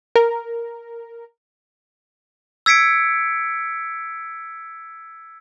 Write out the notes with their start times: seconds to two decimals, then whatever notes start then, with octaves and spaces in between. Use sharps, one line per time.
0.16 A#4
2.66 E6 G#6 B6 C#7 D7